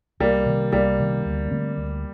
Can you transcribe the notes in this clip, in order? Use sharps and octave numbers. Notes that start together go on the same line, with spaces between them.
C2 G3 A#3
C3 D#3
C2 G3 A#3
C3 D#3
D2
D3 A3 C4
D2